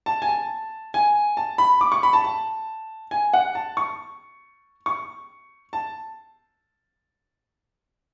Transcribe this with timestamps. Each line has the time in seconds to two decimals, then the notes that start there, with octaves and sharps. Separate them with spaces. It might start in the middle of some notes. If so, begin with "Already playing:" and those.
0.06 A5
0.22 G#5
0.29 A5
0.94 G#5
1.37 A5
1.58 B5
1.81 D6
1.92 C#6
2.03 B5
2.13 A5
2.24 A5
3.11 G#5
3.33 F#5
3.55 A5
3.77 C#6
4.86 C#6
5.73 A5